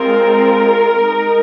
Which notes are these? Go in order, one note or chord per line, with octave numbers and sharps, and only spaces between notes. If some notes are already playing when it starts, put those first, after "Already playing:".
Already playing: G#3 C4 F4 A#4
G#3 D#4